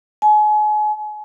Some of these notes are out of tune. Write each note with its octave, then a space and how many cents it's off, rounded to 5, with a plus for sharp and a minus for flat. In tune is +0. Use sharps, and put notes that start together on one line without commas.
G#5 +35